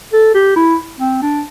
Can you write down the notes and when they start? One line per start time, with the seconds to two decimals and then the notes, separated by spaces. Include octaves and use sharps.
0.13 A4
0.34 G4
0.56 E4
1.01 C4
1.22 D4